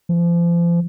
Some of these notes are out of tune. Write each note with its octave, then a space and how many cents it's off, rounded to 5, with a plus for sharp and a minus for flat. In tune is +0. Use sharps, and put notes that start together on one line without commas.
F3 -35